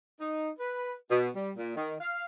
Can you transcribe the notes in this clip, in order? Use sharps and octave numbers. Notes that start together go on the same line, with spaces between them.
D#4
B4
B2
G3
A#2
D#3
F5